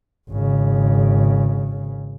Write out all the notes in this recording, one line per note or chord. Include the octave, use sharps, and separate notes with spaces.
G#1 C#3